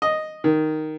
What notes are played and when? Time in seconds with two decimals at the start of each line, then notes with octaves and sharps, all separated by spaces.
0.02 D#5
0.44 D#3